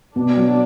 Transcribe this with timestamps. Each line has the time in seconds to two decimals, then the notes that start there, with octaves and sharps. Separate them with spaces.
0.15 B2 D4
0.36 F#3